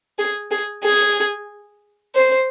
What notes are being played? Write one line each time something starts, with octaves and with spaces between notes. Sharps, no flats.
G#4
G#4
G#4
C5